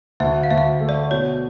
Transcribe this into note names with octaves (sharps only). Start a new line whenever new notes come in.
D2 E5
F5
D2 E5
F5
A3
D5
B2 C#5